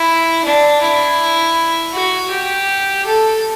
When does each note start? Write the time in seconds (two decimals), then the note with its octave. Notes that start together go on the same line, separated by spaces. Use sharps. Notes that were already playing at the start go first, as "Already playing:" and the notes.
Already playing: E4
0.44 D4
0.81 E4
1.93 F#4
2.31 G4
3.06 A4